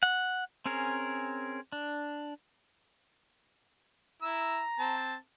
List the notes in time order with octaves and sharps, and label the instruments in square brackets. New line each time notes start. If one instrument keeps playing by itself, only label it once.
[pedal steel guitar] F#5
C4 C#4 G#4 A#4
D4
[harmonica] E4 E6 [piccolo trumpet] A#5
[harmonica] C4 A5